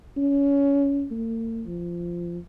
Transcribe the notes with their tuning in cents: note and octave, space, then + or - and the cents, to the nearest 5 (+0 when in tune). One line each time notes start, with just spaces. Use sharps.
C#4 +20
A#3 -45
F3 -15